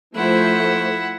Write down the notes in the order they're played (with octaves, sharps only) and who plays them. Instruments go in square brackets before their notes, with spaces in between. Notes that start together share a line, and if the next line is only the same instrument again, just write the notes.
[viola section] F3 A3 C5 [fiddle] E4 F#5